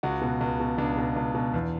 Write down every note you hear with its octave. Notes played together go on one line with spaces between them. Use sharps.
C#2 F#4
B2
C#2
B2
C#2 D4
B2
C#2
B2
E2